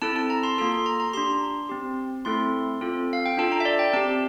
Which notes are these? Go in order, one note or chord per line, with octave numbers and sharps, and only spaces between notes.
C4 E4 A4 A5
A5
A#5
C6
A#3 F4 A4 C6
C6
A#5
A#5
D4 G4 C6
C4 G4
A3 C4 E4 A4 C6
C4 F4 A4
F5
G5
D4 F4 A4 A5
A#5
E5
D5
G5
C4 G4 A5